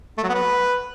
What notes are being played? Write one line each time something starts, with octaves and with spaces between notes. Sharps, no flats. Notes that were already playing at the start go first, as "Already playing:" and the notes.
A3
F#3
B3
B4